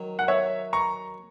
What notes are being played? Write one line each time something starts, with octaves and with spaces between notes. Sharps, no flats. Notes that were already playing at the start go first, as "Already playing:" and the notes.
Already playing: D#3 F#3
F#5
C#5 E5
A#5 C#6